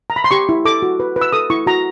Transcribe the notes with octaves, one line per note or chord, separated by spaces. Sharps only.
A#5
B5
C6
G4 C#6
E4
A4 D6
F#4
B4
B4
E6
A4 D#6
E4 C#6
F#4 A#5